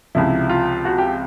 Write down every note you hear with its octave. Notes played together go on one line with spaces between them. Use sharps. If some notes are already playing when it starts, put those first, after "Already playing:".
C#2 C3 F3 E4
F4
F#4
G4